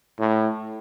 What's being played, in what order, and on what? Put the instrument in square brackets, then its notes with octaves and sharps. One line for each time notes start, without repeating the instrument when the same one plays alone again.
[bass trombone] A2